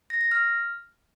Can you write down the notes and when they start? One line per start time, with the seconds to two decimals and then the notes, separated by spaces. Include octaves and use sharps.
0.10 A#6
0.21 A#6
0.31 F6